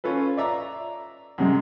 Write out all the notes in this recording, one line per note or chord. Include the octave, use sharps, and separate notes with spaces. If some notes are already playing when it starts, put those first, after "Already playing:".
C#4 F4 A4 B4
D5 E5 A#5
F#2 C3 G#3